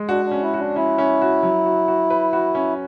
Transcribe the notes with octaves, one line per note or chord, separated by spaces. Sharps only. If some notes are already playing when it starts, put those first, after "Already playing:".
Already playing: G#3
D4 F#4
D4
C#4
E4
F#4
D4
C#4 E4
C#4
F#4
F#3
F#4
F#4
B4
F#4
C#4